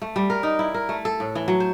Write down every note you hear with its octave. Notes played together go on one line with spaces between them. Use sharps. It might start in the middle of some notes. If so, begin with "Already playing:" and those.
A3
G3
A#4
D#4
E4
A#4
A3
A4
A2
E3
F#3
C5